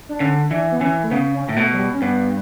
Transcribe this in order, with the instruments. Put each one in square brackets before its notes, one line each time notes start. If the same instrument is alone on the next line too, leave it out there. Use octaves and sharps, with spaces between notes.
[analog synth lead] D4
[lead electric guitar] D3 [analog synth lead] C#4
[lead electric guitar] E3 [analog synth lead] D4
[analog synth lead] B3
[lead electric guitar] E3 [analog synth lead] C#4
[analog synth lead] A3
[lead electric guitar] C#3 [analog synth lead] B3
[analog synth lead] C#4
[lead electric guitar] A2
[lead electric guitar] B2 [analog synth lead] A3
[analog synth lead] F#3
G3
C#4
[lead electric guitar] G2 [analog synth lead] B3